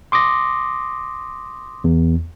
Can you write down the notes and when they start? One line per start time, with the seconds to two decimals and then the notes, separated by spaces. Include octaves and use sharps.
0.12 C6 D6 D#6 A#6
1.84 E2